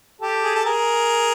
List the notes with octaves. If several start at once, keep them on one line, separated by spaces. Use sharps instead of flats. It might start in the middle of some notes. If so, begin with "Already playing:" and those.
G4 A4
G#4
A4
G#4 A#4